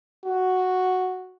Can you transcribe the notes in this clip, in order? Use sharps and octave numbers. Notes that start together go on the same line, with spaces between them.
F#4